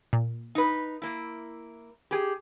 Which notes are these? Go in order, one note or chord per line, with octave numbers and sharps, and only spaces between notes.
A#2
D#4 B4
A#3 E4
G4 G#4